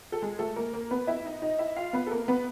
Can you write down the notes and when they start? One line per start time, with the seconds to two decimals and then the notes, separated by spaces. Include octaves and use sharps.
0.12 A4
0.22 G#3 G#4
0.39 A3 A4
0.56 A#3 A#4
0.73 A#3 A#4
0.91 B3 B4
1.07 E4 E5
1.25 D#4 D#5
1.42 D#4 D#5
1.59 E4 E5
1.77 F4 F5
1.93 B3 B4
2.07 A4
2.11 A#3 A#4
2.28 B3 B4